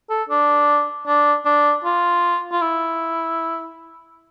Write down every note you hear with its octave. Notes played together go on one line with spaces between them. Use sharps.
A4
D4
D4
D4
F4
F4
E4